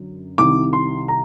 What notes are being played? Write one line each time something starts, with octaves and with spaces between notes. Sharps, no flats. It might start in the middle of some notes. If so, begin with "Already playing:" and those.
Already playing: F#2 D3
C2 C3 D#3 D6
C6
A#5